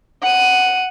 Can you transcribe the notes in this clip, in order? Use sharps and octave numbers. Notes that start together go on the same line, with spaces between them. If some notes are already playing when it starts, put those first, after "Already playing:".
F#5 D#7